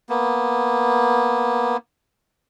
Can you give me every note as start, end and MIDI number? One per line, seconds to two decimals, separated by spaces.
0.09 1.77 58
0.09 1.77 59